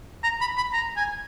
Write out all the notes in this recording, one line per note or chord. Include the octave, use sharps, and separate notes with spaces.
A#5
B5
B5
A#5
G#5